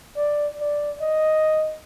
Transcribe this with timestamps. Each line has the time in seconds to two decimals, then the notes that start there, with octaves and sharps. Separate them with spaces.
0.16 D5
0.61 D5
1.01 D#5